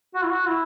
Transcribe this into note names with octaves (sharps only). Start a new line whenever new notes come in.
F#4
E4
F#4
E4